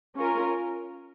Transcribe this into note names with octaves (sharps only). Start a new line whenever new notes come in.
C#4 F4 A#4